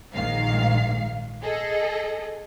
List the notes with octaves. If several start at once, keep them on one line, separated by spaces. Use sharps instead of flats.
A#1 G#2 D#3 F5 C7
G#4 A4 D#5